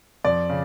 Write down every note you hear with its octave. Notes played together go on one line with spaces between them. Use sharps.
F2 D5
C#3